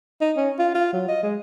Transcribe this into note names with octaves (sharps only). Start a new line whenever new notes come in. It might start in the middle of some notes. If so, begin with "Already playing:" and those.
D#4
C#4
F4
F4
F#3
D#5
G#3